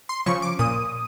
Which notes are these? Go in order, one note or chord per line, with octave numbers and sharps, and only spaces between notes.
C6
C#3 F3 C#6
D6
A#2 D#6